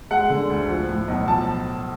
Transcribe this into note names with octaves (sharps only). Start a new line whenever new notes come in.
G#3 F#5
D3
D2
F3
A2
B1
F3 A5